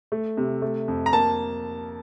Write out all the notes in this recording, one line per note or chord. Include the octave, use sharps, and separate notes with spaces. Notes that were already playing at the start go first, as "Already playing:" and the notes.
A3
C3
A3
F2
A#5
A#3 A5